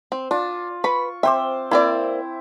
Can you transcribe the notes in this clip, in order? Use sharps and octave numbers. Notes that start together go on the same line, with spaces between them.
C4
D4 F4
B4 B5 C#6
C4 C5 E5 D6
A#3 C4 E4 D5